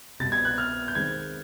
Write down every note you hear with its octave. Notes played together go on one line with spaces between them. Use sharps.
C2 B2 G3 B3 A6
G#6
F#6
F6
G6
D#3 G#3 C4 G#6